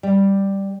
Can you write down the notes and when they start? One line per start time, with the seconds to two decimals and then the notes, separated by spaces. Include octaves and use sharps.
0.03 G3